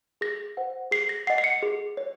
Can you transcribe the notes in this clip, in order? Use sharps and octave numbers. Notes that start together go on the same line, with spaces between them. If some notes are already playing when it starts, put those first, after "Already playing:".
G#4 A#6
C5 F#5
G#4 C7
A#6
D#5 F#5 C7
C7
C#7
G#4
C#5